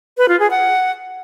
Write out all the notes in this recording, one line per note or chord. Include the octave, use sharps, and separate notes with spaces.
B4
F4
G#4
F#5